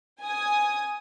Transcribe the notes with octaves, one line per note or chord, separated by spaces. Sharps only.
G#5 D#6